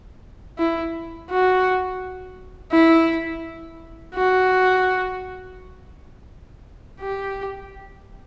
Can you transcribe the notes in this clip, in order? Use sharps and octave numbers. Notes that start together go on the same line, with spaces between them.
E4
F#4
E4
F#4
G4